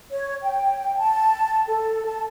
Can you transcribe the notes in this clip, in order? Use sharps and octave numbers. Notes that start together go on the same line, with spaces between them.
C#5
G5
A5
A4
A5